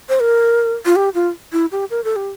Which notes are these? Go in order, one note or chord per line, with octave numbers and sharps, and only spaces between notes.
C5
A#4
F4
G4
F4
E4
G4
A#4
A4
G4